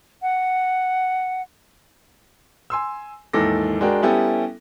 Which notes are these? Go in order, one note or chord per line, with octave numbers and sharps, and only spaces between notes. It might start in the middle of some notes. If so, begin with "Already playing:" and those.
F#5
G#5 C6 E6
D#2 G#2 E3 A4 D6 A#6
G#3 D4 F#4 A#4 G5
G3 B3 C#4 E4 G4 A4